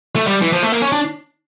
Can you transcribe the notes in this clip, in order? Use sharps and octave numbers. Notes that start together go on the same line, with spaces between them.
A3
G3
E3
F3
A3
A#3
C#4
D4